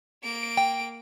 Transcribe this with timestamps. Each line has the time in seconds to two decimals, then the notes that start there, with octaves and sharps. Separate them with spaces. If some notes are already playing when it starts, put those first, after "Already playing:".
0.23 A#3 D7
0.57 G5